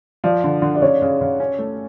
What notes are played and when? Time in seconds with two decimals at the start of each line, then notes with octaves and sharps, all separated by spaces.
0.24 F3 D5
0.44 D3
0.62 D3
0.75 D5
0.82 C#3 C#5
1.02 C#3
1.21 C#3
1.40 C#4
1.59 A3